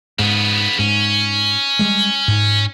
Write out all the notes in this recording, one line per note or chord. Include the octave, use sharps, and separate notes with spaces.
G#2 C#3 B3
G#2 C#4
G3 G#3
G#2